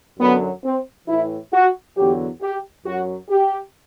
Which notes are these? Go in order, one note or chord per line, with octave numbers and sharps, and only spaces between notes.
F#2 D3 F#3 B3
C4
A2 E3 E4
F#4
E2 D3 F#3 G4
G4
F#2 F#3 F#4
G4